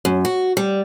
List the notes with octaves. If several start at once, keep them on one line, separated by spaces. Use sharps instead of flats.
F#2
F#4
G3